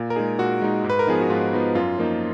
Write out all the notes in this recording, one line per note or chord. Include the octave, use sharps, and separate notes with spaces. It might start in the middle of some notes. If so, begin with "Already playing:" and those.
Already playing: A#2
A#4
G#3 D#4 G#4
A#2 F#4
G#3 D#4
G#2
B4
A#4
F3 B3 D#4 G#4
F#4
G#2 F4
F3 B3 D#4
F#2 F4
F3 A#3 D#4